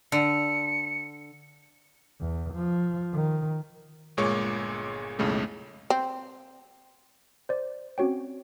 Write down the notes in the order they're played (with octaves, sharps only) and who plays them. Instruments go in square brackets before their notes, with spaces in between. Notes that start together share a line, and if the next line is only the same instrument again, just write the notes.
[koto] D3 [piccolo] C#7
[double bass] E2
F3
D#3
[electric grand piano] G1 A#2 G#3 C#5 C#6 D6
B1 F2 A2 C#3 G#3 A3
[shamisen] C4
[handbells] C5 D5
C4 C#4 F#4 C#5 G5